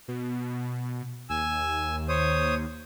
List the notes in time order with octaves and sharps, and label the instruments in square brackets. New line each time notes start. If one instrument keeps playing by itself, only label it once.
[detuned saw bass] B2
[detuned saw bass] D#2 [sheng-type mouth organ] G#5 E6
[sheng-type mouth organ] C5 C#5 D#6